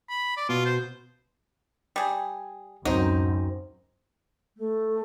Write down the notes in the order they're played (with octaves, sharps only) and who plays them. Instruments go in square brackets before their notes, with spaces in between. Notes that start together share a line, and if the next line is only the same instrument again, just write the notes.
[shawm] B5
D5
[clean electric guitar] B2 [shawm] F4
[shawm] C5
[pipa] G3 G#4
[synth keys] C#2 A2 [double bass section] F#2 [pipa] F#3 [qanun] C4 D#4
[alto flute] A3